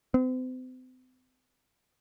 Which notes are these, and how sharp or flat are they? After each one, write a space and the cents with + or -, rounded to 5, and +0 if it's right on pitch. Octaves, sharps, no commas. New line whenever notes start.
C4 -40